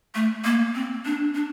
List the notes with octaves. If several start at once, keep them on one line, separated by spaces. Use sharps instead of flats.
A3
A#3
C4
D4
D4